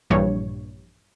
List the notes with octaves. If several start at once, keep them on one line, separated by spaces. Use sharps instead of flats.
A#1 G2 E3 C#5